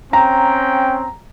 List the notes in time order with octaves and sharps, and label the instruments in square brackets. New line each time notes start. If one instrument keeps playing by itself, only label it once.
[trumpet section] C4 C#4 G5 [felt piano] A#5